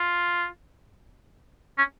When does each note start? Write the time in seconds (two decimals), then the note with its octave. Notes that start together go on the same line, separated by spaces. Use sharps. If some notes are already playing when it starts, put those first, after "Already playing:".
Already playing: F4
1.78 C#4